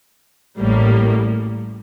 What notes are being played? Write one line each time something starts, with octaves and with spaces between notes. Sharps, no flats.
A1 A2 G3 A#3